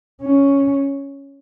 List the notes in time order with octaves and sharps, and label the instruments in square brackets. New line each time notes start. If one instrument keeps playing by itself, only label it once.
[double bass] C#4